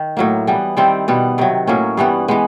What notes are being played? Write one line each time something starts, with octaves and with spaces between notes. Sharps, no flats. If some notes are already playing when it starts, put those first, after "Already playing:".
Already playing: D#3
A2 F#3 A#3
E3 G3 B3
D#3 G3 C4 E4
B2 G3 B3
C3 D#3 F#3
A2 F#3 A#3 C#4
G2 E3 G3 B3
E3 G#3 B3